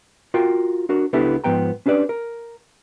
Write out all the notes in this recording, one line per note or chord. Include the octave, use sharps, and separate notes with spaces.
F4 F#4 A#4 G5
D4 F#4 A#4
C#2 B3 D4 E4 G4 A4
G#2 F3 B3 G5 A#5
C#4 D4 G4 B4 D5
A#4